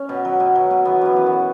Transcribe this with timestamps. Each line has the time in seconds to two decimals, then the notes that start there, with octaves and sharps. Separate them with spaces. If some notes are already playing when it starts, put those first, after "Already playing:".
Already playing: C#4
0.09 B2
0.25 F#3
0.40 B2
0.55 F#3
0.71 B2
0.85 E3 B3
1.01 F#2 B3
1.16 E3
1.26 F#4